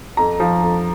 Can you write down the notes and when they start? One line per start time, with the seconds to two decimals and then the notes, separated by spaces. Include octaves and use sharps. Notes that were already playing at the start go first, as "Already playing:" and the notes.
0.17 F2 A#5
0.40 F3
0.63 F2